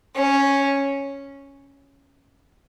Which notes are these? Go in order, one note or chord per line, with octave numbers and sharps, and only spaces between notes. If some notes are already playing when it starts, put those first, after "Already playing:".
C#4